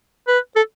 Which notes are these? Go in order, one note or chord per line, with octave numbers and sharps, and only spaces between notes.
B4
A4